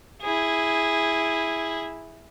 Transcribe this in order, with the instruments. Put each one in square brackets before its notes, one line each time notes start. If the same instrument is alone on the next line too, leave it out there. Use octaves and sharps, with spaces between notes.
[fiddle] E4 G#4